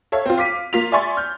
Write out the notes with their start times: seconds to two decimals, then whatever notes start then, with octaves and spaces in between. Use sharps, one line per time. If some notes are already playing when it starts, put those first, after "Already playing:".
0.12 A4 C#5 E5 F5
0.26 C4 F4
0.38 F5 D6 B6 D#7
0.73 A#3 F4 B6 F7
0.92 D5 E5 G#5 C6 C#6 A6
1.17 F6 G6